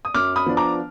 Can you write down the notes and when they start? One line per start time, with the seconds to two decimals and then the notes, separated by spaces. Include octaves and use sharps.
0.05 D#6
0.14 F#2 D6 F6
0.36 B5 D#6
0.46 F3 B3 D4
0.57 A#5 D6